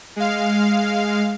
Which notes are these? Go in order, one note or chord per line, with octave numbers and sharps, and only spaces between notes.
G#3 F5